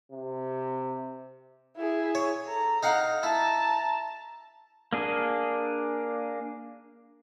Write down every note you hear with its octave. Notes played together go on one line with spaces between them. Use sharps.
C3
E4 G#4
C#5
A4 A#5
D#4 F5 F#5
E4 A5 A#5
A#3 D4 G#4